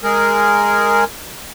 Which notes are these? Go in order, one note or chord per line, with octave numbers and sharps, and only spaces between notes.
G#3 G#4 A#4